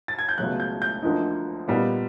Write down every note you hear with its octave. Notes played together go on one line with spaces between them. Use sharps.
A6
G#6
G6
C#2 B2 F#3 A3 F#6
G6
G6
D2 D3 F3 A#3 D#4
A#2 G3 B3 D#4